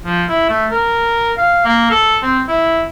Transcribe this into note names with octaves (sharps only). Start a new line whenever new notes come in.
F3
E4
A3
A#4
F5
A#3
A4
C4
E4